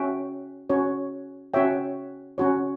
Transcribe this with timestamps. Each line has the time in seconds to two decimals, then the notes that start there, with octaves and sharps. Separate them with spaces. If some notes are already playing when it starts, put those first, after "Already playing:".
Already playing: C#4 F#4 C#5 E5 G5
0.70 C#4 F#4 C#5
1.54 C#4 F#4 C#5 E5 G5
2.38 C#4 F#4 C#5